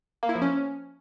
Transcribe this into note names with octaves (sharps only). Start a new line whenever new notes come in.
A#3
E4
F3
C#4